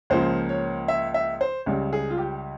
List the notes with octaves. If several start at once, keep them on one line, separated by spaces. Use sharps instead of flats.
C#2 C#3 F3 A#3 C5
C#5
E5
E5
C5
C#2 C#3 G3
G#4
F4
G4